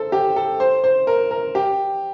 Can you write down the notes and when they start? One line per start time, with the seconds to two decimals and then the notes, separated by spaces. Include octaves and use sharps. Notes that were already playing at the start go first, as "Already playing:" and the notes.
Already playing: A4 C5
0.12 G4
0.36 A4
0.60 C5
0.84 C5
1.07 A#4
1.31 A#4
1.55 G4